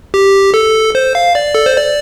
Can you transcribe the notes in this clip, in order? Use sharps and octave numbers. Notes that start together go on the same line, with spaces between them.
G4
A4
C5
F5
D5
A4
C5
D5